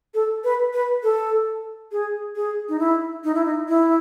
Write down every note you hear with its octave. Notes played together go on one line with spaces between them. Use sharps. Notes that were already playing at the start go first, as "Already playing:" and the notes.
A4
B4
B4
A4
G#4
G#4
D#4
E4
D#4
E4
D#4
E4